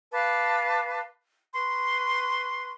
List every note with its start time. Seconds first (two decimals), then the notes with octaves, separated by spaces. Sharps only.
0.12 B4 F5 A5 D6
1.55 B4 C6 C#6